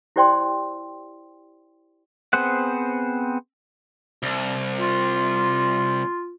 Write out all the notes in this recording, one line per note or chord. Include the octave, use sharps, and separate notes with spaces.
E4 G4 C5 D5 G5 C6
B3 C4 G#4 C5 F#5
C2
F4